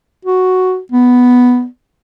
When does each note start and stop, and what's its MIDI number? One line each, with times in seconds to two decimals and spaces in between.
0.25 0.78 66
0.92 1.65 59